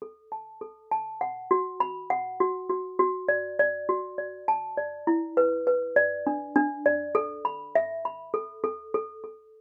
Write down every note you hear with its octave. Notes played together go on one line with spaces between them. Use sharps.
A4
A5
A4
A5
F#5
F#4
B5
F#5
F#4
F#4
F#4
D5
D5
F#4
D5
A5
D5
E4
B4
B4
D5
D4
D4
D5
A4
B5
E5
B5
A4
A4
A4
A4